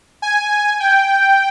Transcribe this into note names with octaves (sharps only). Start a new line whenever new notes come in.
G#5
G5